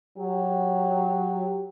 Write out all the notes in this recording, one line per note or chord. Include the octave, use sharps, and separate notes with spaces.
F#3 G4